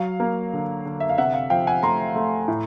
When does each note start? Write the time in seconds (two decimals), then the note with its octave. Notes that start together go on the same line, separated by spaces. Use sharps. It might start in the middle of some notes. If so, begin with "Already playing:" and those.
Already playing: F#3 F5
0.20 A#3
0.53 D3
0.85 D3
1.00 E5
1.10 F5
1.18 C3 E5 F#5
1.34 F5
1.50 F3 F5 G5
1.67 F#5 G#5
1.83 A3 A#5 C6
2.15 A3
2.48 A2